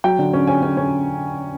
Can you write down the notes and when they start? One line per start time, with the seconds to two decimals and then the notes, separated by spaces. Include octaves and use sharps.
0.04 F#3 G5
0.19 D3
0.33 C#4
0.47 C#4 G#5
0.62 C#4
0.77 C#4